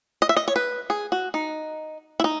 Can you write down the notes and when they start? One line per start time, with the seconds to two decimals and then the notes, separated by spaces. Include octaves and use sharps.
0.22 D#5
0.29 E5
0.37 D#5
0.48 C#5
0.56 B4
0.90 G#4
1.12 F#4
1.34 D#4
2.20 E4
2.24 D#4